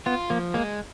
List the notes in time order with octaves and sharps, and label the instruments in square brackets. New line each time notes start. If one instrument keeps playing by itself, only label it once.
[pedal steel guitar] B3 [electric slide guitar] F4
[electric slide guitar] F3 [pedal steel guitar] A#3
[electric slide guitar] G#3 [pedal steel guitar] A#3